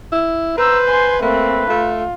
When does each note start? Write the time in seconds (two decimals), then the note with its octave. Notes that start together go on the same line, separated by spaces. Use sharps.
0.13 E4
0.58 B4 C5 A#5 E6
0.89 G#5 C6
1.22 A3 A#3 C4 B4
1.70 A3 F4